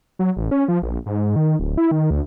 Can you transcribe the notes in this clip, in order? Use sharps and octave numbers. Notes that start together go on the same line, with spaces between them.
F#3
A1
C#4
F3
A#1
G#2
D#3
D1
E4
D#3
D2